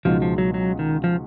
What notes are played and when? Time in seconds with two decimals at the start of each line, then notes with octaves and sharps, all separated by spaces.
0.05 C#2 B2 F3 G#3 D#4 F#4
0.22 F3
0.38 F#3
0.54 F#3
0.79 D#3
1.04 F3